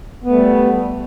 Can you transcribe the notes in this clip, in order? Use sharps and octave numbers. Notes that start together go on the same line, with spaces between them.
G3 A3 B3